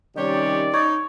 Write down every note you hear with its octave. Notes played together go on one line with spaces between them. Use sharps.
C3 D#3 G3 C#4 G4 C#5 D5
D#4 C#5